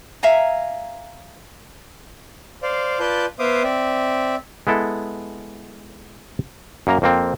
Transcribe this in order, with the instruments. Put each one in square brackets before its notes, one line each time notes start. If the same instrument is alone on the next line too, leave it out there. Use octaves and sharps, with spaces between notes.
[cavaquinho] E5 F5 G#5 A#5
[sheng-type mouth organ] C5 D5 F5
F4 B4 D5 A5 G6
B3 C5 E5 F5 D6 D#6
C4 D5 E5
[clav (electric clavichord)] G#3 B3 E4 A4
F#2 A#3 A#5
F2 A#3 C4